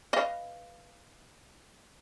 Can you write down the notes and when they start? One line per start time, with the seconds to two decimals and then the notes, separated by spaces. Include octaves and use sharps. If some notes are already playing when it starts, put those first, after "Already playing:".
0.13 B4 D#5 F5